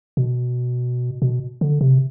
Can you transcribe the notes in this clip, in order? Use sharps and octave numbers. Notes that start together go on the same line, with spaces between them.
B2
B2
D3
C3